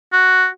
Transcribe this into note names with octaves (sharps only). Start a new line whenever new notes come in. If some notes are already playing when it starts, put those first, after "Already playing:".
F#4